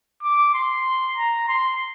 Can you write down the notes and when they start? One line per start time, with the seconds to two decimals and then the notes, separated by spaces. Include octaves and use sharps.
0.23 D6
0.54 C6
1.17 A#5
1.48 C6